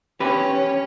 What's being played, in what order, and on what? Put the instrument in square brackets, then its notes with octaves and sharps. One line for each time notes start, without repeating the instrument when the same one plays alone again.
[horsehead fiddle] C#4 C#5 [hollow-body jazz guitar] G4 B4